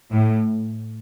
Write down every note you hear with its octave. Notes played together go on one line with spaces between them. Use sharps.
A2